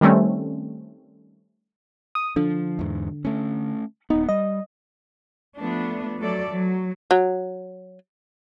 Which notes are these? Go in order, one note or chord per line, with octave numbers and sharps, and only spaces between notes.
D#3 G3 A3 C4 C#4
D#6
D3 F3
E2 G#2
A3 C#4
D#1 B3 D#4
G3 D#5
F3 A3 B3 D4
F#3 A3 A4 D5
F#3
F#3